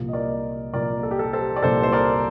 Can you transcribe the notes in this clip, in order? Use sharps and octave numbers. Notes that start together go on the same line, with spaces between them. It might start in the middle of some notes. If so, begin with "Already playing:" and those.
Already playing: C2 A#2 F3 A#3
D#5
A#4 D5
C2 A#2 F3 A#3 A#4 D5
A4
G4
A4
A4 C5
D5
C2 A#2 F3 A#3 A4 C5
C5
A#4 D5